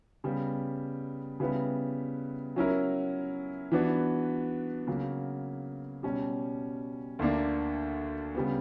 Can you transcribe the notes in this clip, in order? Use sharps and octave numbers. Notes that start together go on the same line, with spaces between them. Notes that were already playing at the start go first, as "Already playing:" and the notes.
C#3 G3 B3
C#3 G3 B3 E4 B4
F#3 C#4 E4 A#4
E3 B3 D4 F#4 B4
C#3 F#3 A#3
B2 G3 C#4
D2 D3 A#3 D4
C#3 G3 B3